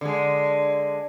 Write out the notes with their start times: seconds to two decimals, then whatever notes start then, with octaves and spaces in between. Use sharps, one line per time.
0.01 D3 G#3